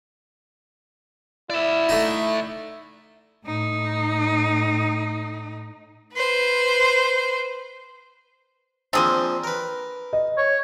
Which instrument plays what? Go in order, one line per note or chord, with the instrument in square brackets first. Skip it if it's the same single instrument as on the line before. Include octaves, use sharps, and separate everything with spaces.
[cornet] E4 [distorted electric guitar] D5 E5
[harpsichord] A3 D#4
[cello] A2 D#4
[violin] B4 C5
[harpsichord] F3 A#3 C4 [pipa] D4 G#4 C5
[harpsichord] A#4 B4
[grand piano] D#5
[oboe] C#5